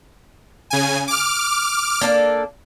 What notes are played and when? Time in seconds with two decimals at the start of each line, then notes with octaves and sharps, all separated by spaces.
0.70 C#3 G#5
1.08 D6 F6
2.01 A#3 D4 A4